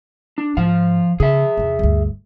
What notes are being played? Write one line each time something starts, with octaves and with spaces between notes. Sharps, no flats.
D4
G#2 F3 F5
C#3 G#4 E5
E2 C3
G1 D2